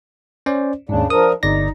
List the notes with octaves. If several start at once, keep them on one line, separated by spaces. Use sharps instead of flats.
C#4 C5 D5
D#2 G#2 C#3 D4
F3 D4 A#4 D#6
G1 D#4 D5 A#6